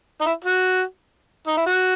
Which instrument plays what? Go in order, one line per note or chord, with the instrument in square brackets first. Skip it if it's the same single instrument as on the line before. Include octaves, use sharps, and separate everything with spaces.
[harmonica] D#4
E4
F#4
D#4
E4
F#4